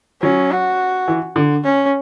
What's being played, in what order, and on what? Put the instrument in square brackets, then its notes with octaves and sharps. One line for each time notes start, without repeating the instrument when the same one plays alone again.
[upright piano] F#3 [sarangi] C#4
[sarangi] F#4
[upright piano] E3
D3
[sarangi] C#4